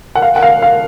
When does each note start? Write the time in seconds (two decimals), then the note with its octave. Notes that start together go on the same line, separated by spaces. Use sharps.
0.15 F#5
0.22 F5
0.36 F#5
0.42 F5
0.62 F5